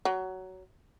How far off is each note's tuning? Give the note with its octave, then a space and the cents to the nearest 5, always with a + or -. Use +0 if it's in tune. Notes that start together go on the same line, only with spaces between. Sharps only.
F#3 +15